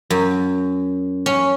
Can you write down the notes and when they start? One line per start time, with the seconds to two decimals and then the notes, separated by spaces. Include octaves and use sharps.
0.10 F#2
1.26 C#4